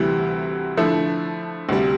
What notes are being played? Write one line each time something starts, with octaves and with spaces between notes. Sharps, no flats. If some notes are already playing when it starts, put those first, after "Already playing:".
Already playing: D2 C3 E3 G3
D3 F3 A3 E4
D2 C3 G3